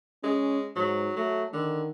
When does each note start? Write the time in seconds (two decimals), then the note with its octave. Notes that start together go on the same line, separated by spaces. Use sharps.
0.24 G#3 C#4
0.76 G#2 F#3
1.17 F#3 A3
1.53 D3 D#3